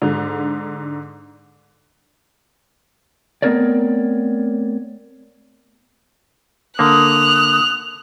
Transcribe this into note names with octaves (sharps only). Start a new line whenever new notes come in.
G#2 D3
A3 B3 C4 A#4 C#5 D5
D3 A#3 D#6 F#6 F7